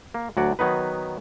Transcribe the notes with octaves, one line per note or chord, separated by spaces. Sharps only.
A#3
D2 F#3 F#4 D5 F#5
D#3 F#3 B3 D#4 B4